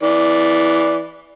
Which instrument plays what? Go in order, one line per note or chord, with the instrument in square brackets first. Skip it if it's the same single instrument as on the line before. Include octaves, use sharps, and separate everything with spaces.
[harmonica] E3 D5